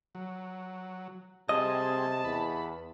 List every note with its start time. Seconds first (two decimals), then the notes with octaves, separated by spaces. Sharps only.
0.15 F#3
1.49 C3 G3 C4 G#4 D#5 A5
2.25 E2 B5